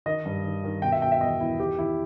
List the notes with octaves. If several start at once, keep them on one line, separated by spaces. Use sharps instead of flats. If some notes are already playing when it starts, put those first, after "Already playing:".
D#3 D#5
G2
D#3
D#3
B2 G5
E5
B2 G5
E5
E2 D#5
E2 E4
D#3 G4
D#3 E4